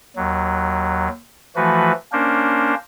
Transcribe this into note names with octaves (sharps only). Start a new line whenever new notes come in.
D#2 F#3
E3 F3 A3 F#4 B4
A#3 C#4 D4 A#4 C5